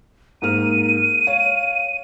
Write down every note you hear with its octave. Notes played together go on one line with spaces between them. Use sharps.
G#2 A#3 F6 D#7
C#5 F5